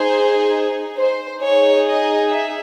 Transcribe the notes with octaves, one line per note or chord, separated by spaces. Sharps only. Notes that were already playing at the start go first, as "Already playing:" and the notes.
Already playing: D#4 G#4 C5
C5
D#4 G#4 C#5
D#5
E5